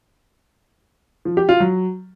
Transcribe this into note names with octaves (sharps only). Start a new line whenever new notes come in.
F3
G4
F4
F#3